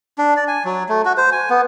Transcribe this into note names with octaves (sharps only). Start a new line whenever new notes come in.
D4
D5
G#5
F#3
A3
F#4
C5
G#5
B3